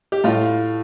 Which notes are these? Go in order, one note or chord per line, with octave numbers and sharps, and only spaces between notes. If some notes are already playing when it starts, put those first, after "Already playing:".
G4
A2 F4